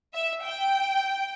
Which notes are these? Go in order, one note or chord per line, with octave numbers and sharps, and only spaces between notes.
E5
G5